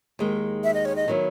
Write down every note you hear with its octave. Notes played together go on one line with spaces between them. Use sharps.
D#2 D#3 G#3
E5
D#5
C#5
D#5
D#3 F#3 B3 E4